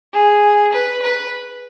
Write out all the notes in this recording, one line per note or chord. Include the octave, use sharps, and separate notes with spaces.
G#4
B4
B4